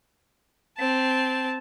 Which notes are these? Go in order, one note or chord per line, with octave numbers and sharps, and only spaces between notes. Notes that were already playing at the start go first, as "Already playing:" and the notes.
C4 A5